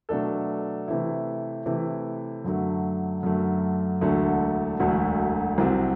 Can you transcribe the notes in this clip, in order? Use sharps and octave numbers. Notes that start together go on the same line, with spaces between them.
B2 F#3 A3 D4 A4
C3 E3 A3 E4
C3 E3 A3 E4
F#2 D3 F#3 A3
F#2 D3 F#3 A3
E1 D2 D3 F#3 A3
E1 D2 D3 F#3 A3
C2 C3 F#3 C4